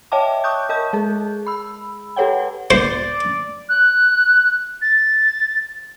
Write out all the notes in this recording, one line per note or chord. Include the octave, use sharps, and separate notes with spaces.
C#5 D#5 E5 G5 A5 D6
C#6 D#6 F#6 G6
A#4 D#5 A5 G6
G#3 G#4
B5 E6
G4 A4 B4 C#5 F#5 G5
C5 D5
F#6
A6